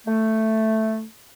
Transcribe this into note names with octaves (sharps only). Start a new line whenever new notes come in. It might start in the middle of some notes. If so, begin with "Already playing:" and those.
A3